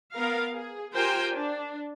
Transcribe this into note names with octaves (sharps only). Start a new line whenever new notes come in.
B3 A#4 F5
G#4
F4 G4 A#4 C5 G5 G#5
D4